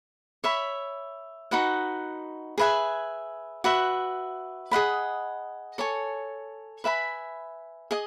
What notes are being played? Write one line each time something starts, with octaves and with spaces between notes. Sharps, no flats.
C#5 E5 B5
D#4 F#4 B4 F#5
G#4 B4 E5 G#5
F#4 B4 E5
G#4 D#5 F#5 B5
A4 C#5 G#5
B4 E5 G#5 B5
G#4 D#5 G#5